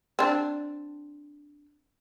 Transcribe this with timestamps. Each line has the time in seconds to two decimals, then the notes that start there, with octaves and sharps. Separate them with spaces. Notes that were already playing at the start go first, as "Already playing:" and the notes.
0.19 C4 D4